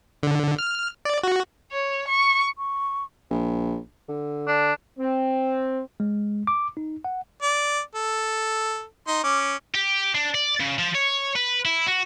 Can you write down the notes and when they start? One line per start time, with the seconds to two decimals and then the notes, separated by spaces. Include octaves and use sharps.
0.23 D3
0.59 F6
1.05 D5
1.24 F#4
1.72 C#5
2.08 C#6
2.57 C#6
3.30 A#1
4.08 D3
4.47 D4
4.98 C4
6.00 G#3
6.47 D6
6.77 D#4
7.05 F#5
7.42 D5
7.95 A4
9.07 D#4 C6
9.24 C#4 D6
9.75 G4
10.15 D4
10.35 D5
10.60 C#3
10.79 F3
10.95 C#5
11.36 B4
11.65 E4
11.87 F#4